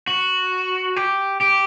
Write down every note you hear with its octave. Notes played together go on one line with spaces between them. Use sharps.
F#4
G4
G4